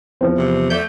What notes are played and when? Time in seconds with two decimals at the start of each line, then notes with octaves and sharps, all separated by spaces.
0.21 E2 E3 F3 C4
0.37 C3
0.70 A3 D5 G6